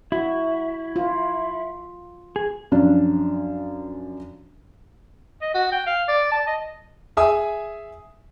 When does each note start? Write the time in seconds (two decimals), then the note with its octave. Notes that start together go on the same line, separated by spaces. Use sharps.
0.12 E4 F#4
0.96 F4
2.36 G#4
2.72 F#2 F3 C#4 D4
5.42 D#5
5.54 F#4
5.72 G5
5.87 F5
6.08 D5
6.32 A5
6.47 D#5
7.17 G#4 E5 G#5 D#6